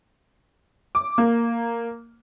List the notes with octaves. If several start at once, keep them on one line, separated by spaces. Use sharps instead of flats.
D6
A#3